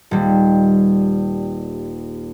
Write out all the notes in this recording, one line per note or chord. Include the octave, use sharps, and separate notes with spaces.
D#1 G3